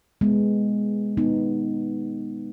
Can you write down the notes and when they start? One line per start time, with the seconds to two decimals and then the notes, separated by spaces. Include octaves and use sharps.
0.21 G#3 B3
1.17 B3 D#4